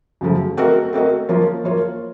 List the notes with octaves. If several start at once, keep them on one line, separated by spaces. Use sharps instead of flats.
F#2 C#3 F3 A3
A3 C4 F#4 A#4 D#5
A3 C4 F#4 A#4 D#5
F3 A#3 F4 A#4 C#5
F3 A#3 F4 A#4 C#5